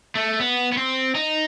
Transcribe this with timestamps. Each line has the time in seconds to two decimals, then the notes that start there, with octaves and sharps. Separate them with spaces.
0.15 A3
0.40 B3
0.72 B3
0.77 C4
1.15 D#4